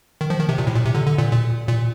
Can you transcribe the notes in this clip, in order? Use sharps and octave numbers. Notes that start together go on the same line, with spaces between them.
D#3
F3
D#3
C3
A#2
A2
A#2
C3
D3
D3
A#2
A#2
A#2